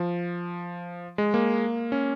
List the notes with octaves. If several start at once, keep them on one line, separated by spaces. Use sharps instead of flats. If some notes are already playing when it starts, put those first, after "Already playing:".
Already playing: F3
G#3
A#3
C#4